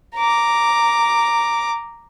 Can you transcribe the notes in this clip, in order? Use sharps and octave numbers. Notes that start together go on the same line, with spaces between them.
A#5 D6